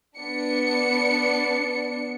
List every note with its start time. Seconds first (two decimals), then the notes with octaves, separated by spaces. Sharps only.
0.17 B3 D4 C#7